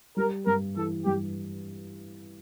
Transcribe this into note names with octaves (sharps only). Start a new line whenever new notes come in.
G3 A#4
G2 A#4
E3 A4
G2 G4